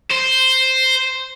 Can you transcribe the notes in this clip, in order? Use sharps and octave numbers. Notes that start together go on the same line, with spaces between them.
C5